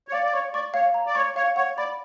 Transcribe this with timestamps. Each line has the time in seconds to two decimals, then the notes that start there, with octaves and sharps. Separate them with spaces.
0.08 C#5
0.12 D5 F5
0.24 D5
0.33 C#5 C#6
0.54 D5 C#6
0.74 C#5 F5
0.94 A#5
1.06 D5
1.15 C#5 C#6
1.36 C#5 F5
1.56 C#5 F#5
1.78 D5 B5